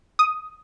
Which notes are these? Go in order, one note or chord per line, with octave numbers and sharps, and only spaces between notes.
D#6